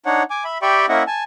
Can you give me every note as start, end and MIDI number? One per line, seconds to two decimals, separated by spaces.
0.06 0.23 62
0.06 0.23 63
0.06 0.23 73
0.06 0.23 78
0.30 0.44 80
0.30 0.44 86
0.44 0.58 76
0.44 0.58 83
0.62 0.86 67
0.62 0.86 74
0.62 0.86 76
0.62 0.86 79
0.62 0.86 83
0.62 0.86 85
0.89 1.03 58
0.89 1.03 61
0.89 1.03 64
0.89 1.03 75
0.89 1.03 76
0.89 1.03 78
1.07 1.24 80
1.07 1.24 81